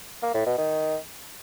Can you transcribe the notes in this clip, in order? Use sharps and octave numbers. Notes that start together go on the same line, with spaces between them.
A#3
A2
B2
D#3